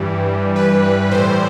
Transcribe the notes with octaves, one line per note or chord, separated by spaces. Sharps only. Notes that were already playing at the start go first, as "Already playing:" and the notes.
Already playing: G2 E3 G3
B4
A2 E3 G3 C5